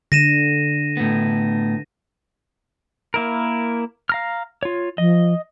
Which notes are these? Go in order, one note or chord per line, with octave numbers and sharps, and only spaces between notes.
D3 A#6 D#7 E7
A2 B3
A#3 E4 A#4
F5 A#5 F6
F4 C#5
F3 D#5